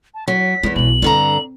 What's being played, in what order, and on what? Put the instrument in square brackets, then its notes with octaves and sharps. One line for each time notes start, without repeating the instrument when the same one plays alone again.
[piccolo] A5
[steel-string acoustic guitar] F#3 [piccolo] B6
[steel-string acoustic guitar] E2 E3 [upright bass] G#3
[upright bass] B1 B2 [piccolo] F#7
[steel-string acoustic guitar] G2 D3 A#5 [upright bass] C4